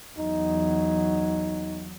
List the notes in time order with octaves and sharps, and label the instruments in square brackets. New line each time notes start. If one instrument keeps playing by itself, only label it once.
[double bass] E2 F#3 [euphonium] D#4